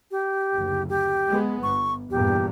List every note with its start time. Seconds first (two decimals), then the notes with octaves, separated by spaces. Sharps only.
0.11 G4
0.54 F#1 D2
0.89 G4
1.29 G#3 B3
1.63 G1 C#6
2.10 E2 G2 A#2 G4